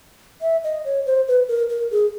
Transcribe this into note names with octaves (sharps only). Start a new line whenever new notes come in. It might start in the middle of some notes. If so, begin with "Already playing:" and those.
E5
D#5
C#5
C5
B4
A#4
A#4
G#4